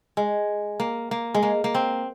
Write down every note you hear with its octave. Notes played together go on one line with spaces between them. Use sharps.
G#3
A#3
A#3
G#3
A#3
A#3
C4